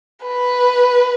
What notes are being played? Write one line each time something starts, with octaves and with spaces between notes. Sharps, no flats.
B4